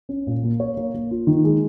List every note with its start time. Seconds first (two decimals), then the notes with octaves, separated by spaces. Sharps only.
0.09 C#4
0.27 A#2
0.43 A#3
0.60 C#5
0.77 A#3
0.94 A#3
1.11 F4
1.27 D#3
1.44 G#3